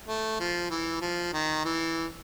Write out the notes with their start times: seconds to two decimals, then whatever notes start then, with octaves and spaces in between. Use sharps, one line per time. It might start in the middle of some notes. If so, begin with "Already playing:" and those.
0.08 A3
0.40 F3
0.71 E3
1.01 F3
1.33 D#3
1.64 E3